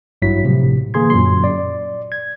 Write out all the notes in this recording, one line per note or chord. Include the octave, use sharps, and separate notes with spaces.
A1 G2 F#3 E4 B6
A2 C3 F3
D3 E3 A#3 G#4 C6 G#6
F#2 A#2 F#3 C6
D5
G#6